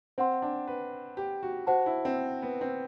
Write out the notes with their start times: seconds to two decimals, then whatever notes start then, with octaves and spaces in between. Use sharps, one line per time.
0.18 C4 C5 F#5 C6
0.42 D4
0.67 B4
1.17 G4
1.43 F#4
1.67 F#4 C5 F#5 A5
1.86 E4
2.05 C4
2.42 B3
2.61 C4